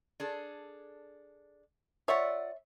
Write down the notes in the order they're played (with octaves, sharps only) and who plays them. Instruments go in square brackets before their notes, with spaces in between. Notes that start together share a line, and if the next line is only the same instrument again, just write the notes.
[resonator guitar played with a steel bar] D4 G#4 A4
[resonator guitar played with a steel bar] F4 D5 F#5 [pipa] C#5 E5